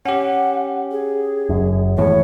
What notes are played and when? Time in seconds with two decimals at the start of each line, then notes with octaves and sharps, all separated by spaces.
0.05 C#4 G4 F#5
0.91 G#4
1.49 F#1 F#2
1.97 G#1 E2 A2 C#5